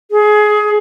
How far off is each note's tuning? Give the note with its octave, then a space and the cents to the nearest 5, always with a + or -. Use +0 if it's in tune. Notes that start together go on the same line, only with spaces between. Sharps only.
G#4 +20